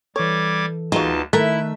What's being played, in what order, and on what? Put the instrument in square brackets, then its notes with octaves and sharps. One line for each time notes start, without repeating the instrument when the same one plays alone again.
[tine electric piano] E3 A4 [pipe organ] G3 D6 G#6 [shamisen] C#5
[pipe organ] D2 A5 [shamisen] F#3 G#3 [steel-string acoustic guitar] B3 D#4 F4
[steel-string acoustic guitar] D#3 A3 E5 [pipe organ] E4 [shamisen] A4 A#4 [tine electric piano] F#6